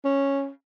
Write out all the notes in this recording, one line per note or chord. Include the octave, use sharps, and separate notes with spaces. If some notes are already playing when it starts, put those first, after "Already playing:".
C#4